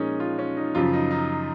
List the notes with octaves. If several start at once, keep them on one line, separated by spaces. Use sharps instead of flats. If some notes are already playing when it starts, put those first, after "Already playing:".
Already playing: A#2 F3 G#3 C#4 D#4 G#4 A#4
F4
C#4
D#4
F#2 C#3 F3 F4
D#4
D#4